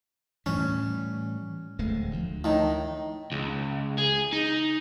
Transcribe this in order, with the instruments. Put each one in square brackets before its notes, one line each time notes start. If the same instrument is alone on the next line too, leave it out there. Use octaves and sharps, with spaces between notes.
[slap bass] A2 E3 G3 [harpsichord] C#4
[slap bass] D1 G#3 A3
D2 F3
[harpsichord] A2 D#3
[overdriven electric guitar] C#2
G#4
D#4